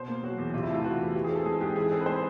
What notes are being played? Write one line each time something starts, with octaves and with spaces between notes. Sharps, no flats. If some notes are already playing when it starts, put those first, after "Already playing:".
Already playing: B2 C5
A#3
F#3 F#4
E2
C3 F4
E4
A3 F4
E3 F#4
E2
E3 G4
G#4
C4
A4
G#3 G#4
G#2 G4
E3 G#4
C4 A4
B4
G#3 C5